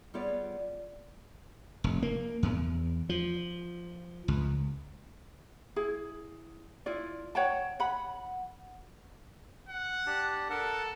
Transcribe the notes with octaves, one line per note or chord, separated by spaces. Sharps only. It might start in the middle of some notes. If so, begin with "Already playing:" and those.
G3 B3 F4 G#4 C#5 D5
F1
A#3
E2
F3
C#2
E4 G#4
E4 F4 D5
C#5 F#5 G5 A5
F#5 B5
F#5
D4 G4 A5
A4 A#4 F#5 A5